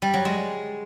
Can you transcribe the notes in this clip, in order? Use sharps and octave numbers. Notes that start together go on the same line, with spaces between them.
G3
F#3
G#3